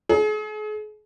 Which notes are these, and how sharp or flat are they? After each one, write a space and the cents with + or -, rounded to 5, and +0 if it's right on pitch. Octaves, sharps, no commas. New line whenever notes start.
G#4 +40